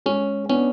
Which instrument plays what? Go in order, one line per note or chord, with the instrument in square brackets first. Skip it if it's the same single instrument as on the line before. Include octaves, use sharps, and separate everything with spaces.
[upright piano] G#3 [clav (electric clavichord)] C#4
[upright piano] B3 D4 [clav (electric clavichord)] C#4